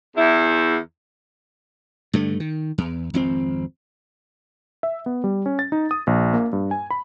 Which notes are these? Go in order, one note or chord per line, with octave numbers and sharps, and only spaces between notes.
E2 E4
G2 D3 A3
D#3
E2
G#1 F2 C4
E5
B3
G3
C#4
A6
D#4
D#6
A#1
A#3
G2
G#5
B5